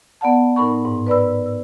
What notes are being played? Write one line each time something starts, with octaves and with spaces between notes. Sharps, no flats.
B3 D5 F#5 A5
A2 D#4 A#4 B5 C#6
G#2
B4 D5 B5 E6
E6